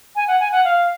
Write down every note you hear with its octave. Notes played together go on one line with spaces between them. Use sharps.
G#5
F#5
G#5
F#5
F5